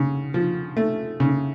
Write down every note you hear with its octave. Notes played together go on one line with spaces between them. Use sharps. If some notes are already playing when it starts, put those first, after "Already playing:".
Already playing: C#3
F3
A3
C#3